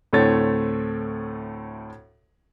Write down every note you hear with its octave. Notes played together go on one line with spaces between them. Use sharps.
D2 A2 A3 C4 C#5 A6